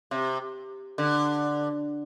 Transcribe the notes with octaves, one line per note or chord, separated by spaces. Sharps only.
C3
D3